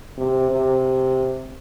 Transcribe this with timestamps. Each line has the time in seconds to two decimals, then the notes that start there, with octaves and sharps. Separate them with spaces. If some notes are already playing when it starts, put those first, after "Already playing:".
0.18 C3
0.51 C3